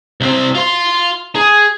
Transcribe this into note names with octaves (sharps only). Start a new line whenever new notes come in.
C2 C4
F4 C6
G#4